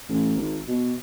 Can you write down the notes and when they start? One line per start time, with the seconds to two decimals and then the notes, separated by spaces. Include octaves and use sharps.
0.09 A1
0.37 G#1
0.68 B2